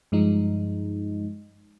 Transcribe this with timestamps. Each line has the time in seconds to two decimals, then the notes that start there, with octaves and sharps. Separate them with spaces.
0.12 G2 F3 G#3 D#4